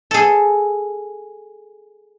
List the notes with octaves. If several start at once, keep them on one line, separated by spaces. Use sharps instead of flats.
G#4 A4